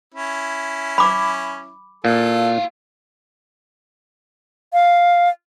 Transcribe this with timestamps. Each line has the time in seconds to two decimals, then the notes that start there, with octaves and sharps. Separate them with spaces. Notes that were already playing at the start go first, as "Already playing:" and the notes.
0.14 C#4 E4
0.98 B5 D6
2.05 A#2 E4 A4 F5
4.73 F5